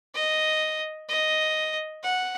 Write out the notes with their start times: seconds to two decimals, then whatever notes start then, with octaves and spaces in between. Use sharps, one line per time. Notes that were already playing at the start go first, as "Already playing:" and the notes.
0.14 D#5
1.09 D#5
2.03 F#5